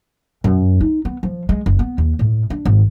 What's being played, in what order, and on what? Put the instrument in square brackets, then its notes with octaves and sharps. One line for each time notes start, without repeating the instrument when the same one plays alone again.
[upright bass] F#2
D#4
B3
F3
G#3
F#1
B3
D#2
A2
D4
G#1